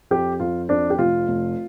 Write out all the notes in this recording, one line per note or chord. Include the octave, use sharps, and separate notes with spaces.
F2 G4
F2 F4
F2 D4
G4
F1 F4
F1